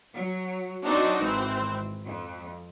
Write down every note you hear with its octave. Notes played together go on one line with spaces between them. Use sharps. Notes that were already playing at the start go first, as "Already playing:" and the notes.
F#3
F#3 C4 D4 D#4 F#4
G#1 E3 C4
F2